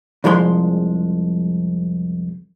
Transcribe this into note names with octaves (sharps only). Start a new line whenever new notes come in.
C2 F2 F3 G#3 B5 C6